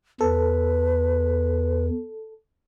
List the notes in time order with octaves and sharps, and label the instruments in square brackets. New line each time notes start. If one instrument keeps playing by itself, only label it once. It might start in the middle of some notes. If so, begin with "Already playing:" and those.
[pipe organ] E2 [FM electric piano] A4 [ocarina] B4